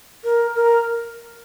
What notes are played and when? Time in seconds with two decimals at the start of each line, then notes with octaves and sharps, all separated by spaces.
0.24 A#4
0.55 A#4